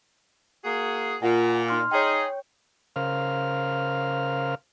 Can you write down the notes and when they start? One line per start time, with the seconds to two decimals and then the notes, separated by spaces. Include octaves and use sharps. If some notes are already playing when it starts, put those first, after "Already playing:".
0.64 A#3 F#4 G#4
1.22 A#2 F4 F#5 G#5
1.68 D#4 C6 F6
1.91 D#4 G#4 C#5 G5
2.96 C#3 A#4 C5 F5 F6